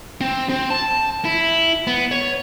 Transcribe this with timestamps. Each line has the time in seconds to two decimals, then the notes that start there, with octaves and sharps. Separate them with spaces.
0.21 C4
0.49 C4
0.70 A5
1.25 E4
1.87 B3
2.11 C#5